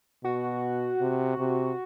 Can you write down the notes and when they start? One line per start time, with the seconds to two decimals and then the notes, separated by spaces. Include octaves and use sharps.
0.24 B2 F#4
1.00 C3
1.38 C3